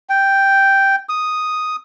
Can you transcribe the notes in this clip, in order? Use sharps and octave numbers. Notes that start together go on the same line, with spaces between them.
G5
D#6